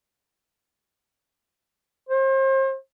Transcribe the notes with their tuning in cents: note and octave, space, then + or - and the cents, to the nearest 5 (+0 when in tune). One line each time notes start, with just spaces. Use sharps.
C5 +35